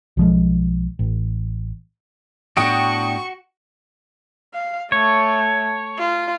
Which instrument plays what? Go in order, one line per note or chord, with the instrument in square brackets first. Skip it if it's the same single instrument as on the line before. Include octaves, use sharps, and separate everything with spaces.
[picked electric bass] B1 F3 G#3
A1
[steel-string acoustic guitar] A2 B3 D4 [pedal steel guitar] F#4 [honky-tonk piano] G5 D#6 D7 [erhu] C#6
[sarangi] F5
[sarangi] A3 [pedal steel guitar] C#5
[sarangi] F4